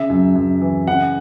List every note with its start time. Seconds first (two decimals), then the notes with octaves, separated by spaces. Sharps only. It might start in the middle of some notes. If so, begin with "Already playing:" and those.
Already playing: C#3 E5
0.10 F#2
0.35 F#2
0.61 E3
0.87 C#3 F#5